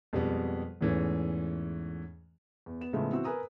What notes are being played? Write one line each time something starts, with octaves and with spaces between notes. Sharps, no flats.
F2 B2 G3 G#3 B3
E2 G#2 E3 A3 C#4
E2
B3 E7
A2 C#3 F3 G#3 A3 B3
E3 C4 F#4 E6
A#4 B4 G#5 A#5 D#6